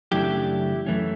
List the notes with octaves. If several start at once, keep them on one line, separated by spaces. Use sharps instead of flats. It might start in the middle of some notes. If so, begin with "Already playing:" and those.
F#2 C#3 E3 A3 D4 E4 G4
F#2 E3 A3 C#4